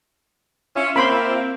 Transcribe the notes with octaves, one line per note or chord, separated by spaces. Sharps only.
C#4 F4 E5
A#3 C4 B5 C6